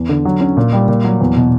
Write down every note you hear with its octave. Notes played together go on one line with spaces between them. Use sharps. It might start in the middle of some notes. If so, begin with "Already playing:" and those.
Already playing: E2
D3
F#3
C#4
A#2
G3
A#2
F#3
E2
B2